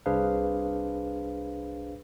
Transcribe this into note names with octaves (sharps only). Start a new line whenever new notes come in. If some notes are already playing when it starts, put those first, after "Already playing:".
C2 D4 G#4 B4 C5 F5